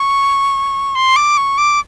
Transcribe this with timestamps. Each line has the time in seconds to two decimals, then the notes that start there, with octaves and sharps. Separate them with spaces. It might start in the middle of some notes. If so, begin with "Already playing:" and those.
Already playing: C#6
0.95 C6
1.16 D6
1.37 C#6
1.58 D6